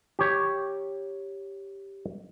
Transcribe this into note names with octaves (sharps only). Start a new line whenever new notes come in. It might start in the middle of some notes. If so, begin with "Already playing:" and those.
G4 C#5